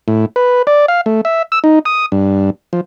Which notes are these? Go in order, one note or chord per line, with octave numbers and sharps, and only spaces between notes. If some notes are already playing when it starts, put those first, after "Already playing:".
A2
B4
D5
F5
A3
E5
E6
D#4
D#6
G2
F3